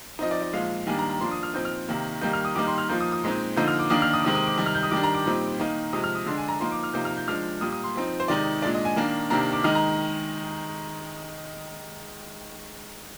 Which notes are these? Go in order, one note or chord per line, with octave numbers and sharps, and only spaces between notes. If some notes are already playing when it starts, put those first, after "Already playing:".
F3 C4 D#4 D#5
D5
D#5
A#2 F3 G#3 F5
D#3 G3 A#3 D4 G#5
A#5
A#5
F3 A#3 D4 C6
D#6
F6
A#2 F3 C4 D#4 G6
F6
C3 D#3 A#3
D#3 G3 A#3 D#4 G6
F6
D#6
D#3 G3 A#3 D#4 D6
C6
F6
F3 A#3 D#4 G6
D#6
D#6
A#2 G#3 C4 D#4
D3 F3 A#3 D#4 G6
F6
D6
D#3 A#3 D4 D#6
F6
D#6
D6
C3 D#3 G#3 C4 D#6
D#6
D6
C3 D#3 G3
F6
G6
D#6
D#3 G3 D4 D6
A#5
D6
A#2 G3 C4 D#4
D#3 A#3 D#4
C3 F3 G#3 D#6
F6
D#6
D3 G#3 D4 C6
G#5
A#5
F3 A#3 D#4 C6
D6
F6
C3 F3 A#3 D#4 G6
F6
G6
F3 G#3 D4 F6
A#2 G3 A#3 D#6
D#6
C6
F3 C4 D#4
C5
C3 D#3 G#3 D#4 D5
A#2 G#3 D4 D5
D#5
G#5
D#3 A#3 D4
C3 D#3 A#3 D4 A#5
D6
D#3 G#3 D#4 F6
A#5